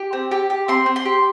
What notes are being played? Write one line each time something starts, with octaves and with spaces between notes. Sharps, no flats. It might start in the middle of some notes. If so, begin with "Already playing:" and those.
Already playing: G4
C4
G4
G4
C4 C6
C4
C6
G4